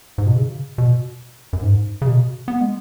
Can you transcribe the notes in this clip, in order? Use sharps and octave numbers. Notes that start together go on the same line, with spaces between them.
G#2
B2
C#3
B2
F#2
G#2
C#3
B2
B3
G#3